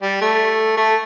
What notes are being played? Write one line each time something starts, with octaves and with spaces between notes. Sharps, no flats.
G3
A3
A3